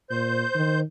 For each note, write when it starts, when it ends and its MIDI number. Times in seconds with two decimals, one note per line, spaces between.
0.10 0.44 46
0.10 0.80 72
0.10 0.80 91
0.54 0.83 51